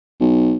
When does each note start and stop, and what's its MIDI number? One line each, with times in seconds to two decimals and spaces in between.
0.20 0.56 35